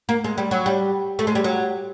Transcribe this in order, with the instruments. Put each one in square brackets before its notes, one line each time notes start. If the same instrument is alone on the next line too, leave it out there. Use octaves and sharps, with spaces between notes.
[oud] A#3
G#3
G3
F#3
G3
A3
G#3
G3
F#3